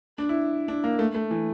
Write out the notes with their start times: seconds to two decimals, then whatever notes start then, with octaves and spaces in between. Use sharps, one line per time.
0.18 D4
0.29 E4
0.68 D4
0.84 A#3
0.99 A3
1.15 A3
1.31 E3